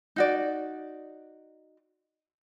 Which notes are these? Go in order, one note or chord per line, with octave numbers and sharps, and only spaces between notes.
D#4 F#4 D5